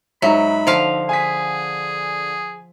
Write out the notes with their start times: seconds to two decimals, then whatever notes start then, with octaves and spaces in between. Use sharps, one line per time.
0.22 G#2 F#3 D#4 F#4 E5 A#5 B5
0.67 D3 F3 D4 F5
1.09 G#4 G#5 B6